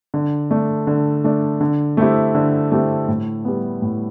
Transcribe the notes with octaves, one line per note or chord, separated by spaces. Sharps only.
D3
A3 D4
D3
A3 D4
D3
A3 C4 E4 G4
D3
A3 C4 E4 G4
A2
G3 B3
A2